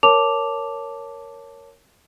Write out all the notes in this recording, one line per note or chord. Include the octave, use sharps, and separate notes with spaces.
A#4 C#5 A5 D6 F7